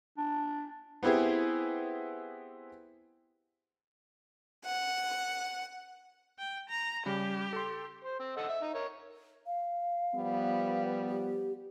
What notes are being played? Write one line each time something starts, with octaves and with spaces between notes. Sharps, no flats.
D4
B3 C4 E4 G4 G#4
F#5
G5
A#5
C#3 G3 G4
A4 C6
C5
C4
A4 D#5 F#5
E5
D#4
A#4 C#5
F5
F3 G3 B3
G4